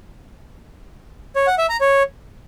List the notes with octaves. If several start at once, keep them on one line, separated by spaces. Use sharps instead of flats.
C#5
F#5
E5
A#5
C#5